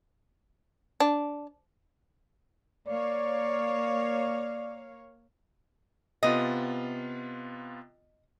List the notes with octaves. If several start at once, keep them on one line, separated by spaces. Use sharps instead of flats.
D4
A#3 C#5 D5 F5
C3 B3 F4 D#5